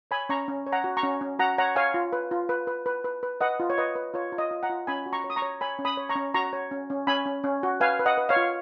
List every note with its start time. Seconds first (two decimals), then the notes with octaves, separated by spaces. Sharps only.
0.11 C#5 G#5 B5
0.29 C#4 A#5 C#6
0.48 C#4
0.66 C#5
0.72 F#5 A#5
0.84 F#4
0.97 A#5 C#6
1.03 C#4
1.21 C#4
1.39 F#4 F#5 A#5
1.58 C#5 F#5 A#5
1.76 C#5 F5 G#5
1.94 F4
2.13 B4
2.31 F4
2.49 B4
2.67 B4
2.86 B4
3.04 B4
3.23 B4
3.41 B4 D#5 F#5
3.60 F4
3.70 C#5
3.78 B4 D#5
3.96 B4
4.14 F4 C#5
4.32 F4
4.38 D#5
4.51 F4
4.63 F#5 A#5
4.70 F4
4.87 C#4 G#5 B5
5.06 F#4
5.13 A#5 C#6
5.24 C#5
5.30 D#6
5.36 A#5 C#6
5.42 C#5
5.61 C#5 G#5 B5
5.79 C#4
5.85 B5 D#6
5.97 C#5
6.09 A#5 C#6
6.16 C#4
6.34 F#4 A#5 C#6
6.53 C#5
6.71 C#4
6.90 C#4
7.07 C#4 G#5 B5
7.26 C#4
7.44 C#4
7.63 F#4
7.80 B4 F5 G#5
8.00 B4
8.06 D#5 F#5
8.17 B4
8.29 C#5 F5
8.36 F4